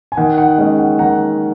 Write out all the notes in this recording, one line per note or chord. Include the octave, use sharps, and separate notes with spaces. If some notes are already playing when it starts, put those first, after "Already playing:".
G#5
D#3 F#5
F#5
G#3 C#4 D#5
F#5
D#3 F#5 A#5